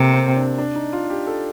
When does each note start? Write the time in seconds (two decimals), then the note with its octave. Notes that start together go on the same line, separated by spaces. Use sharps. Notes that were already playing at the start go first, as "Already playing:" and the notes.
Already playing: C3 A#3 C4 G4 A4
0.14 C4
0.27 C4
0.36 D4
0.58 D4
0.75 D#4
0.93 F4
1.10 G4
1.27 A4